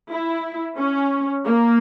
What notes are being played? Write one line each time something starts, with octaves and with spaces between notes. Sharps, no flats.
E4
C#4
A#3